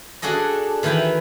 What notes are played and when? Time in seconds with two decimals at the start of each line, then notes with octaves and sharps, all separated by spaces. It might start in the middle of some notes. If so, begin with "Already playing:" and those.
0.22 D4 F#4 G#4 A4 D#5
0.83 D#3 E3 E4 B4 G5 G#5